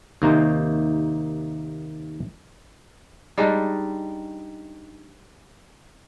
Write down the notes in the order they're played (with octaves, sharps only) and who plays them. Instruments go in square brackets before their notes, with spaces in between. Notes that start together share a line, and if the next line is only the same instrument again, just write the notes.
[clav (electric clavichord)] D#2 C3 A#3 D#4 C5
[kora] G3 G#3 D4 D#4